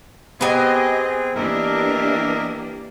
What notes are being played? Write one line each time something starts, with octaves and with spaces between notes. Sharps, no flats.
B3 C4 G4 G#4 D#5 G#5
E3 A#3 D4 G4 A#4 D#5 E5